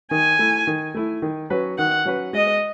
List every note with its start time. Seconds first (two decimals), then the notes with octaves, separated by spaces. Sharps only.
0.11 D#3 G#5
0.39 A3 E4
0.67 D#3
0.94 A3 E4
1.22 D#3
1.50 F#3 C#4 F#4 B4
1.78 D#3 F#5
2.05 F#3 C#4 F#4 B4
2.33 G#3 D#5